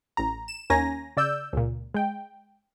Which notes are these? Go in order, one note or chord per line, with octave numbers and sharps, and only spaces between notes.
A1 A#5
E7
D#2 A#3 C#4 G#5 A#5 A#6
C#3 D5 E6 G6
C#2 A#2
G#3 G5